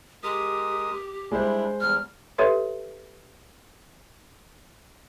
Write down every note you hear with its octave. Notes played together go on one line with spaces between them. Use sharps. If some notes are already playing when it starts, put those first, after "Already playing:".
G#3 G4 A#4 D#6
G3 G#3 D4 E4 C5
E2 G3 F6
G4 A4 B4 C#5 E5 C6